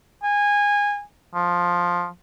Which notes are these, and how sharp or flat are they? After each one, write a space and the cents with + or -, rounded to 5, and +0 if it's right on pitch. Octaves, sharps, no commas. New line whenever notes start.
G#5 -20
F3 +5